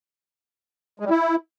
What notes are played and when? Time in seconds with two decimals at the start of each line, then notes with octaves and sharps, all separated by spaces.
1.00 G#3
1.05 G3
1.10 E4